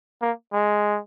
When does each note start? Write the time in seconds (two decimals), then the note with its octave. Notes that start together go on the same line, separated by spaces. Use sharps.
0.22 A#3
0.53 G#3